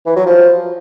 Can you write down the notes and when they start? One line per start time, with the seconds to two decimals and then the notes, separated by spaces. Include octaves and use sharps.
0.06 E3
0.16 F#3
0.26 F3